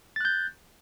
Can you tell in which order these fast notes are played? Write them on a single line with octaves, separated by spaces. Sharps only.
A6 F#6 G6